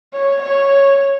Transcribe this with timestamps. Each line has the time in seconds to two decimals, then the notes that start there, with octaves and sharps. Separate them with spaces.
0.14 C#5
0.42 C#5